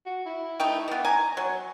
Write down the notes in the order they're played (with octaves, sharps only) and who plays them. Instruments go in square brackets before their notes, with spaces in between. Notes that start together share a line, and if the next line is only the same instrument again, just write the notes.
[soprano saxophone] F#4
E4
[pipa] A3 D#4 G5
E3 B3
[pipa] G#5 [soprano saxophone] A#5
[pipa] F#3 [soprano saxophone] C#5